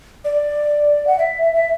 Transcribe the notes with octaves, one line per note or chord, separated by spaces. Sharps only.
D5
F#5
E5
E5
E5